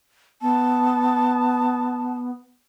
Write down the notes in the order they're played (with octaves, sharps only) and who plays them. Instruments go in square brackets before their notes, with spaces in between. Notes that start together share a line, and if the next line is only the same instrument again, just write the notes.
[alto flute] B3 [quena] A5